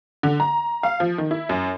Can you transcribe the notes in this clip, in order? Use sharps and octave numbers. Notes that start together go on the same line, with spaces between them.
D3
A#5
F5
F3
D#3
E4
F#2